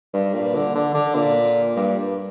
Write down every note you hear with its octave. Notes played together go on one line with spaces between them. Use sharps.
G2
A#2
D3
D3
D3
A#2
G2